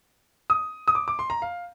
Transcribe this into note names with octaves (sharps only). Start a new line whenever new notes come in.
D#6
D#6
D6
D6
C6
A#5
F5